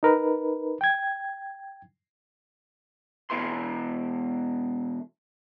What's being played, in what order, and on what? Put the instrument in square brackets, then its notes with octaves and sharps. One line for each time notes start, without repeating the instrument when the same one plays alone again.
[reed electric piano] D#4 A#4 B4
G5 G#6
[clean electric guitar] E2 G#2 B2 E4 B4 C6